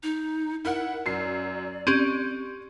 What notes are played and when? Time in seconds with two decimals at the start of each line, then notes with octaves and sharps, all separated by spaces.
0.03 D#4
0.65 E4 A#4 F#5
1.06 F#2 D5 C7
1.87 C4 C#4 G4 D7 D#7